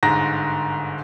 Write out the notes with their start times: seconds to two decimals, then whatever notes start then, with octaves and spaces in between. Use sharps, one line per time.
0.03 G1 G#2 A#6